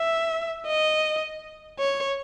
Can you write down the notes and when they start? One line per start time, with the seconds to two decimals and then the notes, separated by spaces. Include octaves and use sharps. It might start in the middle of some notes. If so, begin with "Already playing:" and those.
Already playing: E5
0.67 D#5
1.79 C#5